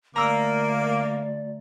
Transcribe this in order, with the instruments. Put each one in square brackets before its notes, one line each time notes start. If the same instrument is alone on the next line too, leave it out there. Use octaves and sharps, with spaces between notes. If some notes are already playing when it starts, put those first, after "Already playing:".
[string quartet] D2 [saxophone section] A#3 [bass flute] D5 [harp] A#5 E6